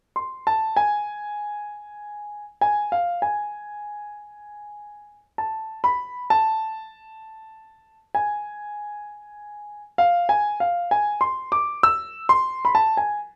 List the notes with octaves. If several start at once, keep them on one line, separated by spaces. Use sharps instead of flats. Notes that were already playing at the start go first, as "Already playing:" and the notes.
C6
A5
G#5
G#5
F5
G#5
A5
B5
A5
G#5
F5
G#5
F5
G#5
C6
D6
E6
C6
B5
A5
G#5